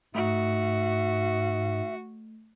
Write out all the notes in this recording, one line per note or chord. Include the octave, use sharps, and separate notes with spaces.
G#2 A3 F#4 E5